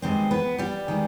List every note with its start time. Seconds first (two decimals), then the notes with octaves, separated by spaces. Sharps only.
0.02 G2 D#3 G#3 B3 C4 C5
0.31 B3 B4
0.58 G3 G4
0.88 D#3 G#3 B3